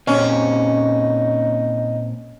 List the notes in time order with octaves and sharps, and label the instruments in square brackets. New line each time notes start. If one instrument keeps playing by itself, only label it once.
[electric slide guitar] A#2 C4 [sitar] C#4 [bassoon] D#4